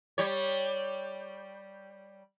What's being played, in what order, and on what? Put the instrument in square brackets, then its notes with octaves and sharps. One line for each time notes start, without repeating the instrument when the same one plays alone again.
[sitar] G3 C#5